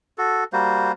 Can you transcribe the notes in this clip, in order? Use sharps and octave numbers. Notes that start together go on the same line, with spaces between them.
F#4 A4
G3 A#3 F#4 C5